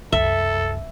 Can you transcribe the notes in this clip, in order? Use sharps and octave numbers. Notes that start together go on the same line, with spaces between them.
C2 F#2 A4 E5